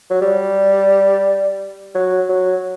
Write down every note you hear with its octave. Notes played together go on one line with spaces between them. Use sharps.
F#3
G3
F#3
F#3